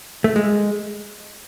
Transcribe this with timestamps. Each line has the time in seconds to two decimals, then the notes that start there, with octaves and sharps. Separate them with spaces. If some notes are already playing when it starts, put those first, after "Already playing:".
0.24 A3
0.36 G#3